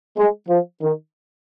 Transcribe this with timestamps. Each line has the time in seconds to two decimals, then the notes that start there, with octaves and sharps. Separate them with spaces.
0.17 G#3
0.49 F3
0.82 D#3